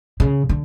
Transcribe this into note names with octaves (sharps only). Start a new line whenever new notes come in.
C#3
D3